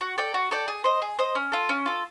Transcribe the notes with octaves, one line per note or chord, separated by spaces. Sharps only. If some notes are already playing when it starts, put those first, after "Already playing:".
F#4
A4 D5 G5
F#4
A4 D5 G5
G#4
C5 D#5
G#4
C5 D#5
C#4
F4 A4
C#4
F4 A4